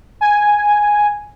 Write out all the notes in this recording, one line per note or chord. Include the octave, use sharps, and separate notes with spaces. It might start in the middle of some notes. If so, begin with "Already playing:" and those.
G#5